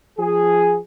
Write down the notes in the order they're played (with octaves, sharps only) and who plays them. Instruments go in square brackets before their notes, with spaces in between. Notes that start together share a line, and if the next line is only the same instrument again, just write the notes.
[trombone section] F3 G#4